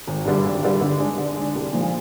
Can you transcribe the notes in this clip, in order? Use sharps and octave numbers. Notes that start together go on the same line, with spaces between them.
G#1
G2 D3 G3
G#1
G2 D3 G3
D3
G#3 D4
D3
G#3 D4
C2
A#2 F3 G#3